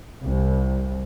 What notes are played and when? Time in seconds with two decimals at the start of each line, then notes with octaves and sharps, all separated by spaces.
0.23 C2